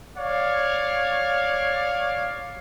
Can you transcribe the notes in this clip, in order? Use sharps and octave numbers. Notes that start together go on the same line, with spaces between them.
C#5 D5 F5